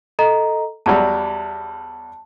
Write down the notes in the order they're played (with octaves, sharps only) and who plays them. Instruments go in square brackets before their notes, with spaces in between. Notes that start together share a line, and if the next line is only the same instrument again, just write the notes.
[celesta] A4 D#5 A#5
[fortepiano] E2 F#3 G3 [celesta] A5